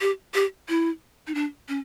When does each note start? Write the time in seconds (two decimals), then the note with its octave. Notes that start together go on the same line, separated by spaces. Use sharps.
0.01 G4
0.34 G4
0.69 E4
1.27 D#4
1.35 D4
1.69 C#4